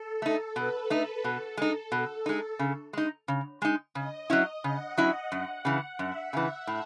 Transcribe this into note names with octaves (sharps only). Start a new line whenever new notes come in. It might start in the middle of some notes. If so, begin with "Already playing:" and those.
Already playing: A4
A3 D#4
B2 B4
A3 D#4
B2 A4
G#3 D#4
B2
G#3 D#4
C#3
G#3 D#4
C#3
G#3 D#4
C#3 D#5
F#3 C#4 E4
C#3 F#5
F#3 C#4 E4
F#2
C#3 E3
F#2 E5
C#3 E3
A2